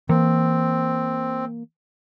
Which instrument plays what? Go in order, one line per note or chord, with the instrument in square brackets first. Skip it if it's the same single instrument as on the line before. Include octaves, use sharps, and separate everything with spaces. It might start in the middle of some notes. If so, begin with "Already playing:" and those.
[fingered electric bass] E3 [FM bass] A#3 [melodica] C4